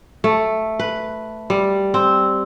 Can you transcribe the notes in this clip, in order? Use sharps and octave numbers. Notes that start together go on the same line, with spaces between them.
A3
B4
G3
C4